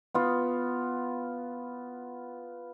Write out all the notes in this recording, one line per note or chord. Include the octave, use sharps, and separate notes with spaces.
B3 F4